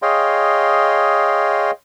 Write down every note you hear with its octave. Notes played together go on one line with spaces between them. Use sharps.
G#4 C#5 D#5 F5 G5 C6